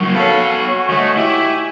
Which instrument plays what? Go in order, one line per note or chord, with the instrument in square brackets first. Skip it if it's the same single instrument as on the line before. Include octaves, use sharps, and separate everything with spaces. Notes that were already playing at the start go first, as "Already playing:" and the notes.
[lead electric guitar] F#2 C#3 [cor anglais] F#4
[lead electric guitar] B3 C#5 [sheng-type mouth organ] A4 F5 B5
[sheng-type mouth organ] G#5
[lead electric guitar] D2 A3 [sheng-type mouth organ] C#5 D#5
[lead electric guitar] E4 [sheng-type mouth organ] G4 G#5